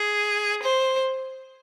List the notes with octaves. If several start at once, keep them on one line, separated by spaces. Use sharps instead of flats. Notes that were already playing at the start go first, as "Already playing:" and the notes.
Already playing: G#4
C5